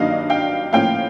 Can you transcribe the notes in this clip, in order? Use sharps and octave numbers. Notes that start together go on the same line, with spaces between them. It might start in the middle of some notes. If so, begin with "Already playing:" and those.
Already playing: G2 D#3 F#3 A#3 D4 D#5 F5
F5 G5
A2 F3 A#3 C#4 F5 G5